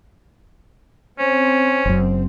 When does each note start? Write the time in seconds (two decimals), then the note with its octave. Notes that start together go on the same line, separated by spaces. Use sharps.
1.19 C4 C#4 C5
1.85 F#1 F#2